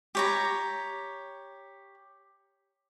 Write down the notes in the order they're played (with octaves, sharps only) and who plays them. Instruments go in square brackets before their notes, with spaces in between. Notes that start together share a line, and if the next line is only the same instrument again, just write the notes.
[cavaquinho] G4 C#5 A#5